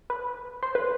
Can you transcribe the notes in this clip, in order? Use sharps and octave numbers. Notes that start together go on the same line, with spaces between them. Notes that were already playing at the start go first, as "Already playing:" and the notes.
B4
C5
B4